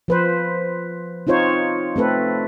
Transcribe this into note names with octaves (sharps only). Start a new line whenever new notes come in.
F3 B4 C5
C4 D#4 F4 C5 C#5
A3 C4 A4 B4